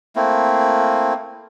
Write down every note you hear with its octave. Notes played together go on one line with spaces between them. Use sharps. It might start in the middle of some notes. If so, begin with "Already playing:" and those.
A3 A#3 C4 E4